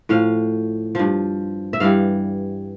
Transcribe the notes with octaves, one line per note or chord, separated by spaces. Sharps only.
A2 F3 F5
G2 F3
E5
G2 E3 G3 F5